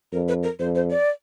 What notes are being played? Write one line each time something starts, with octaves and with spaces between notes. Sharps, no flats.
F2 A#4
B4
A#4
F2 C5
C5
D5